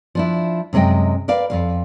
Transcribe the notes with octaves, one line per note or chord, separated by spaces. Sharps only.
F3 D4 E4
F#2 C3 G#3 D#5 G5
A#4 B4 D5 F5
F2 D#3 F5